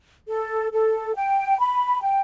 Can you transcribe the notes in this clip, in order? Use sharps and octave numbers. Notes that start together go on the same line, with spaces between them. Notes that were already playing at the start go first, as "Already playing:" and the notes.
A4
A4
G5
B5
G5